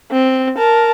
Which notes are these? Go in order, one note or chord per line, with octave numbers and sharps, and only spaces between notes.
C4
A#4 A5